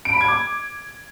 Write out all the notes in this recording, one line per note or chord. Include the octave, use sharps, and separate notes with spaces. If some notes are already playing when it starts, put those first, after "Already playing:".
D7
B5
G#6
D6